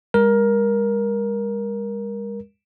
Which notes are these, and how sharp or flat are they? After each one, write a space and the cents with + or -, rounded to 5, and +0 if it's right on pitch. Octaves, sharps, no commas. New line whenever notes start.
G#3 -45 A#4 +15